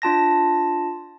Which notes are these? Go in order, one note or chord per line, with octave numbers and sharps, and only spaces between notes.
D4 F4 A5 A#6